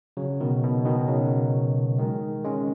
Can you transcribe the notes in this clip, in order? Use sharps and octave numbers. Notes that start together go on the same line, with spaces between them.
C#3 F#3
B2 D#3
B2
B2 D#3
C#3 F#3
D#3 G#3
G#3 C#4